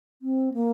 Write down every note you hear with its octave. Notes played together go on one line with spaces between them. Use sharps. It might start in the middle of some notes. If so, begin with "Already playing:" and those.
C4
A#3